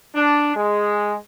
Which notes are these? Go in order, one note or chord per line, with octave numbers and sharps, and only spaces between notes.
D4
G#3